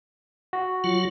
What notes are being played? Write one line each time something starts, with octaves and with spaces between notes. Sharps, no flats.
F#4
F#3 F4